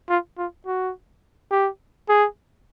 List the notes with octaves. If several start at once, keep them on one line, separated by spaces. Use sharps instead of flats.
F4
F4
F#4
G4
G#4